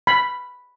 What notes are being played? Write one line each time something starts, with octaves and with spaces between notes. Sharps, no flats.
B5